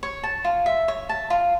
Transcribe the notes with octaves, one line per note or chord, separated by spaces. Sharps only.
C#5
A5
F4
E5
C#5
A5
F4